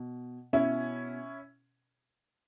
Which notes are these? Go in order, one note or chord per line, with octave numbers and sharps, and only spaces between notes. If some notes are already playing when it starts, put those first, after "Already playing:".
Already playing: B2
B2 C#4 E4